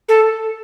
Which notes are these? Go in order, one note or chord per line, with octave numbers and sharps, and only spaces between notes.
A4